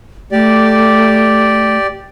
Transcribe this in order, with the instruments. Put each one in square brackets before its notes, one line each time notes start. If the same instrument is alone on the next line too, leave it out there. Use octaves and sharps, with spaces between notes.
[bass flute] A3 [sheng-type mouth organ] G4 D5